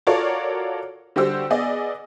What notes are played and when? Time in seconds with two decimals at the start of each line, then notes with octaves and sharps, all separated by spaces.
0.07 F4 F#4 A4 A#4 C#5 D5
1.16 D3 G3 F#4 G4 C5 E6
1.50 B3 G#4 D5 D#5